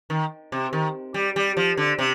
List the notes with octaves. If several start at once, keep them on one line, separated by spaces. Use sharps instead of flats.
D#3
C3
D#3
G3
G3
F3
D3
C3